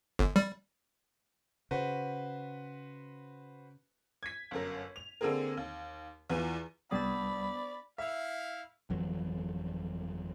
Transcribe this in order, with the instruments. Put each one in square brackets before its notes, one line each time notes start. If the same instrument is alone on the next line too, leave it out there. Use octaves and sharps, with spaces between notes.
[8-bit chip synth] G1
G3
[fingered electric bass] C#3 [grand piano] F#4 B4 C5
[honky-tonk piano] G#6 B6
G1 F#2 A#4
F7
D3 A#3 C4 G#4 A#4
D#2
E2 E3 F4 D#7
[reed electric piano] C2 G3 D#6 [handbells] B3 D4 A6 [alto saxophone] D5 [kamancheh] B5
[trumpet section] E4 F5 [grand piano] E5
[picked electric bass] G1 F2 E3 F#3